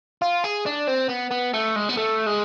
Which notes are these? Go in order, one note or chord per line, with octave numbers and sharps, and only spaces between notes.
F4
G#4
D4
C4
B3
B3
A3
G#3
B3
A3
G#3